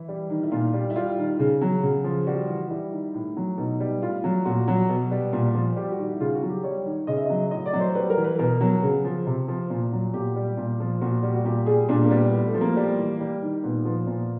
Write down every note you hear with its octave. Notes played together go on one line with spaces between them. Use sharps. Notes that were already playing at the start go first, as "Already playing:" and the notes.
Already playing: E3 E4
G3
D#3
E4
A#2 F4
G3
E4
G3 F4
D#3
C#3
F#3
C#3
F3
G3 F#4
E3
G3 E4
D#3
A2
F#3
B2 D#4
G3
A2 F4
F#3
A#2 F#4
F#3
B2
G3
A#2
F3
G3 G4
F#4
D#3
E4
C#3 F4
F#4
F#3
G4
G3 C#5
D#3
C#3 D#5
E5
F#3 D#5
A2 D#5
D5
F#3
C5
G3 B4
A#4
E3
B4
B2 A#4
F#3
C#3
F3
C3
F3
A#2
F#3
A#2 G4
G3
A#2
F3
A#2 F#4
G3
F#4
A#2 G4
G3 G#4
A#2 D4
A#3
G3 B3
A2
A3
F3
A#3
G3
E3
G3
D#3
A#2 B3
F3 B3
A#2